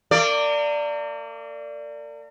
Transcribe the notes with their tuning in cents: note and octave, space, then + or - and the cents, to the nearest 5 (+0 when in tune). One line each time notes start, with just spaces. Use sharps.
A#3 -40 D5 +0